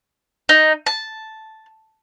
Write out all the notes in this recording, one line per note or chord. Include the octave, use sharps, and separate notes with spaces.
D#4
A5